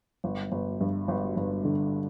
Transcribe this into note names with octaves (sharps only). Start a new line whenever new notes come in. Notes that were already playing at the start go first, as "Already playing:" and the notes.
G1
G1
G2
G1
G1
D3